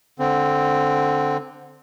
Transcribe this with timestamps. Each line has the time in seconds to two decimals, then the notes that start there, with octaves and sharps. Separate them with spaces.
0.19 D3 C4